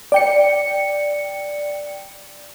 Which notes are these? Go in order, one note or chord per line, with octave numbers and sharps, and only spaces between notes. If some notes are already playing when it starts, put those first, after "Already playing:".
D5 G5 C#7